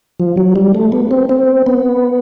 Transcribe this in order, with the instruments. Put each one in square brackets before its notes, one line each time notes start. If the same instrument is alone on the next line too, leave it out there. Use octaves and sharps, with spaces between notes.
[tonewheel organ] F3
F#3
G3
A3
B3
C4
C4
B3